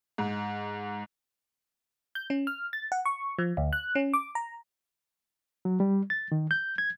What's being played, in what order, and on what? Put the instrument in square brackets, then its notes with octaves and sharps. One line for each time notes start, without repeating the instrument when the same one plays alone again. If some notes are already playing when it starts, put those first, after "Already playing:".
[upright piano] G#2
[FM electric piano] G6
C#4
F6
A6
F#5
C#6
F3
D2
F#6
C#4
D6
A#5
[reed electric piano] F#3
G3
A6
D#3
G6
G#6